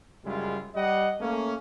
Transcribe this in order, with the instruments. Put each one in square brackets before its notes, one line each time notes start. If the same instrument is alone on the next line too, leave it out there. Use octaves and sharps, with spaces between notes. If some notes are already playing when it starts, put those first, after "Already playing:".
[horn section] F#2 C#3 G3 G#3 E4 F4
G3 D#5 F#5
A3 A#3 C#4